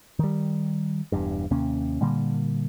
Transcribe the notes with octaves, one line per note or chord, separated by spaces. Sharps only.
D#3 G3
E1 E2 G2
D#2 C3 A#3 C#4
A#2 D3 G3 A#3